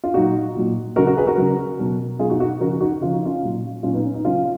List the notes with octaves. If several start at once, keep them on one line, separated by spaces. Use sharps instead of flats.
F4
A#2 F#3 D#4 F#4
A#2 F#3
C#3 F#3 F#4 A#4
F#4 A#4
G#4 B4
F#4 A#4
C#3 F#3
B2 F#3
B2 F#3 F4 G#4
D#4 F#4
D#4 F#4
C#3 F3 F#4 A#4
D#4 F#4
C#3 F3 F4
D#4
C#4 F4
A#2 F#3
A#2 F#3 C#4 F4
B3 D#4
C#4
B3 D#4
C#3 F#3 C#4 F4